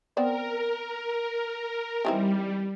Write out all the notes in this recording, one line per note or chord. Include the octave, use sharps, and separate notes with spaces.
B3 C4 A#4 D5
D#3 E3 G3 C4